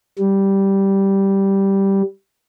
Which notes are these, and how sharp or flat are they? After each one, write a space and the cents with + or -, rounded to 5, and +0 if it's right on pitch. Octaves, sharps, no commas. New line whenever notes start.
G3 -5